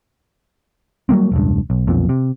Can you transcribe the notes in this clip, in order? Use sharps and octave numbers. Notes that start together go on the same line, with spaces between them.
F#3 G3 A#3 C4
E1 C#2 G2
B1
B1 F2 A#2
C3